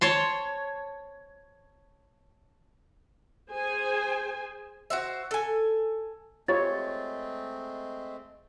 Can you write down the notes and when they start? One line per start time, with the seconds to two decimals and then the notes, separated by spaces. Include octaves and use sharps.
0.01 C#5 A5 C6
3.50 G#4 C5 G#5
4.90 F#4 C5 E5
5.31 A4 G#5
6.48 G#3 A3 C4 F4 G4 C#5 A6